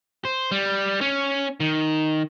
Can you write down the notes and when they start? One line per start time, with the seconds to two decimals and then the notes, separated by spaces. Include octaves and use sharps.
0.25 C5
0.52 G3
1.01 C#4
1.60 D#3